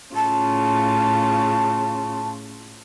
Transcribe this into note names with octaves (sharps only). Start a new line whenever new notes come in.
A2 C#3 F4 A5